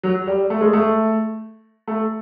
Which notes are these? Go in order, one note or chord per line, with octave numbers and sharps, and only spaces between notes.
F#3
G3
A3
G#3
A3
A3